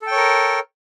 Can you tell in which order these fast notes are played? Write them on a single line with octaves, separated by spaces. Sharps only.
A4 G5 C#5 A#4